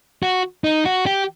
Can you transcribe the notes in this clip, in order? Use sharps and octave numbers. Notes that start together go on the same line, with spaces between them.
F#4
D#4
F#4
G4